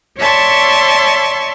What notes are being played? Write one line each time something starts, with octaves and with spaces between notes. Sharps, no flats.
C#5 D5 E5 A5 C6 C#6